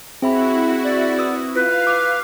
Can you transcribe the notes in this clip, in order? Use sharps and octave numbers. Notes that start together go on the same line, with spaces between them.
C4 E4 F#4 G#4 E5 B5
D5
B4 D#6 E6
F4 B4 F5
D6